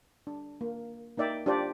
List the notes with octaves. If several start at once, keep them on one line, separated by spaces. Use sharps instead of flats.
D4
A#3
A#3 D#4 D5 E5 G5
D4 F4 G4 C5 D5